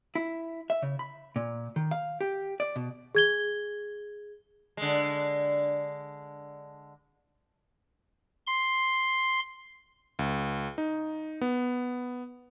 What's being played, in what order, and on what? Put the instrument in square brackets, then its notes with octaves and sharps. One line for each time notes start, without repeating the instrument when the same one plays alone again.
[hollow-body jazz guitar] E4
E5
C#3
B5
A#2
D#3
F5
G4
D5
B2
[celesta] G#4 G#6 G7
[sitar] D3 G#3
[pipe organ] C6
[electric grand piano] C#2
D#4
B3